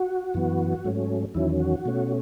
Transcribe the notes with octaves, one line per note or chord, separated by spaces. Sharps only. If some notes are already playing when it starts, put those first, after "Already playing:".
Already playing: F#4
F#2 E3 B3
G#2 F#3 A3 C#4
E2 D#3 F#3 C#4 E4
F#4
B2 A3 C#4